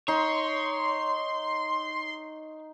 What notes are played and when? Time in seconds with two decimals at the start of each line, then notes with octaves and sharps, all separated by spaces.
0.08 D#4 C#5 C6